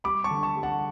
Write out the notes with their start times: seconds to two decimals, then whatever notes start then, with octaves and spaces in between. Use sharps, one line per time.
0.04 G3 B5 D6
0.24 A5 C#6
0.31 D3
0.43 A5 C#6
0.56 G3
0.63 F#5 A5